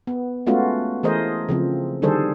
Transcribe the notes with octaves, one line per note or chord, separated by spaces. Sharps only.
B3
G#3 A3 B3 C#4 F4 F#4
E3 A3 G#4 A#4 C5 D#5
C#3 F3 C4
D3 D#3 G3 G#4 A4 C5